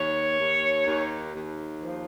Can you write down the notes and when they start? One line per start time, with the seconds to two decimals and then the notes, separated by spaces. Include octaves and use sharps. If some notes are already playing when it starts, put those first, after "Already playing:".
Already playing: D#2 C#5
0.39 D#2
0.86 D#2
1.34 D#2
1.81 F3